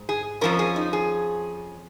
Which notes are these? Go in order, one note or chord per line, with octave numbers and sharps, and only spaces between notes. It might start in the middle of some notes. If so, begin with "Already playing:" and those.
Already playing: G#2
G#4
F2 F3 A#3 C#4 A#4
G#4
D#4
G#4